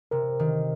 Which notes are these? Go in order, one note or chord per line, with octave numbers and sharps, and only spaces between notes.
C3 A#4
D#3